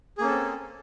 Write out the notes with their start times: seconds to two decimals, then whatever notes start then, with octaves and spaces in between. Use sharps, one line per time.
0.18 G#4
0.21 A#3
0.24 C#4
0.27 A4
0.30 C4